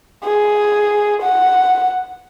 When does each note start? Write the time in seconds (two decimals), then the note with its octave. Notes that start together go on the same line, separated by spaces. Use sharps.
0.24 G#4
1.22 F#5